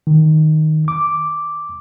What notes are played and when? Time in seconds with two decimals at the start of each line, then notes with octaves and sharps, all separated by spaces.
0.07 D#3
0.88 D6